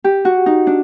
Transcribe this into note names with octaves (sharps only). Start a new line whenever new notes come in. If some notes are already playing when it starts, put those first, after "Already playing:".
G4
F#4
D#4
D4